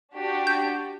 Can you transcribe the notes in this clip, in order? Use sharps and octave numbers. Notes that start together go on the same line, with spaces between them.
D4 F#4 G4
G6